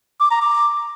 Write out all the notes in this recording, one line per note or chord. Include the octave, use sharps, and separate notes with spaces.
D6
A#5
D6